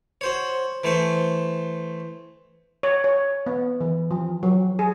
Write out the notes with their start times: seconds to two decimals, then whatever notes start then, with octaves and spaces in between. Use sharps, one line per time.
0.21 F#4 C5 C#5
0.84 E3 A3 C5 C#6
2.83 C#5
3.04 C#5
3.46 B3
3.81 E3
4.11 F3
4.43 F#3
4.79 G#4